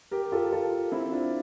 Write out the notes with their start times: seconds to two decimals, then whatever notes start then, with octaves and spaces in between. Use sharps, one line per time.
0.11 G4 A#4
0.32 F4 A4
0.52 F4 A4
0.92 C4 E4
1.12 D4 F4